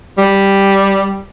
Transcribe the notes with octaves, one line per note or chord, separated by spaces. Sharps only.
G3